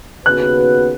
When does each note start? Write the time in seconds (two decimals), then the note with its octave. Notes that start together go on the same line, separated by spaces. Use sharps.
0.25 D#2 C#3 B3 F#4 B4 F#6